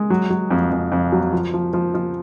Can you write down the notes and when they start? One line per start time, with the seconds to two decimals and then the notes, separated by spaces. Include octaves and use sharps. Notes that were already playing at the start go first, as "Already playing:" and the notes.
Already playing: G#3
0.10 F#3
0.30 F#3
0.51 F2
0.71 F2
0.92 F2
1.12 F#3
1.33 F3
1.54 F3
1.73 F3
1.94 F3